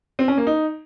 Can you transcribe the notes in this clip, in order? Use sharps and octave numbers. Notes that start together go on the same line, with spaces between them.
C4
C#4
A#3
D#4